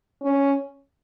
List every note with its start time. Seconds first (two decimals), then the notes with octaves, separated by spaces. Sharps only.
0.22 C#4